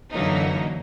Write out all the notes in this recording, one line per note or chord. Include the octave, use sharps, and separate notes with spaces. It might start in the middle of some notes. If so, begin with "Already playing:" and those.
F#2 D3 E3 F#3 A#3 D#4